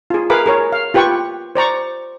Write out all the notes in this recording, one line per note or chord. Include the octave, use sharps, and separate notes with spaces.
F4 G#4
G#4 A#4 B4 F5 B5 D6
G#4 A#4 C#5
F5
F4 G4 B4 G5 C#6
C5 D5 A#5 C#6